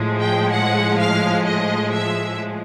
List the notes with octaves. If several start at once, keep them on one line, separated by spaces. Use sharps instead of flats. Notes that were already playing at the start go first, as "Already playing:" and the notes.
Already playing: A2 F3 G#3
G5
F#5
F5
D#5
E5